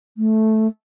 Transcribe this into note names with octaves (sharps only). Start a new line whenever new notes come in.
A3